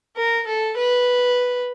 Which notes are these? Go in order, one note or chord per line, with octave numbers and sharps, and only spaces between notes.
A#4
A4
B4